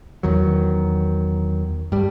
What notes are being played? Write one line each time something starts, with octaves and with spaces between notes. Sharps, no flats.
E2 D#3 F#3
G2 G3